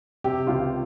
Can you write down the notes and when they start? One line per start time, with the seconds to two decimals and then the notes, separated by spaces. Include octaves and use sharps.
0.24 C3 G4
0.47 C#2 F4